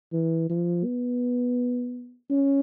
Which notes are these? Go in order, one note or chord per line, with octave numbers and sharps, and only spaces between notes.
E3
F3
B3
C#4